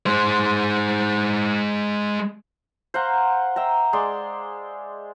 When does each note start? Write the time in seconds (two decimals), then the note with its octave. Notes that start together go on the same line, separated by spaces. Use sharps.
0.06 G#3 C5
2.94 C5 F5 F#5 A#5
3.56 E5 G5 A#5
3.93 G#3 D5 C6 D6